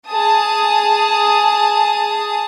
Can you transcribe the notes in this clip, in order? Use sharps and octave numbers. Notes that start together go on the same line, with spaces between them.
G#4 A5 D#6